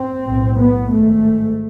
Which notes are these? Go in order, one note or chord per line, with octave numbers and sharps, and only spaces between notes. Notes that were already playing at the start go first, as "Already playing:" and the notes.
Already playing: C4
B1 A2
B3
G#1 G#2 A3